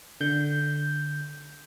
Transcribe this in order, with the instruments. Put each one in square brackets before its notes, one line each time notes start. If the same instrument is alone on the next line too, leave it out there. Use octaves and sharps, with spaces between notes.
[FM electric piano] D3 G6